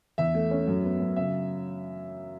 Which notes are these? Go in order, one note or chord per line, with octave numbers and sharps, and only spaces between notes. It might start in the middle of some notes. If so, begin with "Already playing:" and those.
E2 E5
A3
C#4
F#2
B3
F#2
C#3 E5